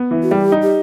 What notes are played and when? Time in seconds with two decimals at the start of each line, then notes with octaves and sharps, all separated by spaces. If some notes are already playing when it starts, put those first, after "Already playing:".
Already playing: B3
0.11 E3
0.23 F#4
0.31 G3 G4
0.52 D#4
0.62 G4